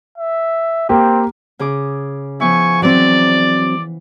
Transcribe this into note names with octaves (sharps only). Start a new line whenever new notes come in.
E5
A#3 C4 G4
C#3 G#4 D6
F3 B3 E4 G#5 C#6
E3 F#3 C4 D5